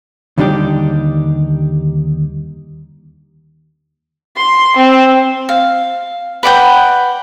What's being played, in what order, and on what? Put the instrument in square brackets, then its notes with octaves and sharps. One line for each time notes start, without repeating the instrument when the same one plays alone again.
[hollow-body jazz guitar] D#2 D3 G3 D4 D#4 G4
[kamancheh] C6
C4
[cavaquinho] F5
B4 D5 F#5 G5